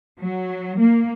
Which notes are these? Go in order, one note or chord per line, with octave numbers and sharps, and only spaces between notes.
F#3
A#3